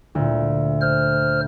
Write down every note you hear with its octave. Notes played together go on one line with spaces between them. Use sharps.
D2 A#2
C5 F6